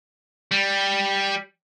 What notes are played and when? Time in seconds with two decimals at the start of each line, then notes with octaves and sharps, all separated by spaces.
0.51 G3